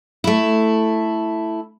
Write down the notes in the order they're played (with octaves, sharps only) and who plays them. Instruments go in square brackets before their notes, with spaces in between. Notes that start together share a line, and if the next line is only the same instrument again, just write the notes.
[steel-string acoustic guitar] A3 E4